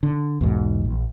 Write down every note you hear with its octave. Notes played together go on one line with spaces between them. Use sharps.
D3
B1 E2 G#2
A#1